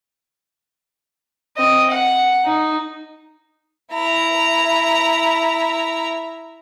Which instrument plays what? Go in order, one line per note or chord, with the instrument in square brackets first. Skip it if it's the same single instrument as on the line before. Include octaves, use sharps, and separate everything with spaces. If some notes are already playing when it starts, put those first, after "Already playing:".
[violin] C4 D#5
F#5
D#4
[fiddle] E4 A#5